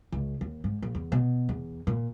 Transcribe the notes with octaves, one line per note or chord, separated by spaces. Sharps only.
C#2
D#2
G#2
A#1
E2
B2
E2
A#2